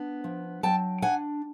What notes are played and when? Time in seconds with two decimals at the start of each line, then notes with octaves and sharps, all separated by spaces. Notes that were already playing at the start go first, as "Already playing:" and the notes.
Already playing: B3 D4
0.24 F3
0.63 F#3 G5 A5
1.02 D4 F#5 G#5